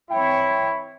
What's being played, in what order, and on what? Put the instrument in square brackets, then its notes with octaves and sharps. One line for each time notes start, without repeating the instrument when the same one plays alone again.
[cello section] E3 C4 C#5 [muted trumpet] E4 [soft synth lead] G5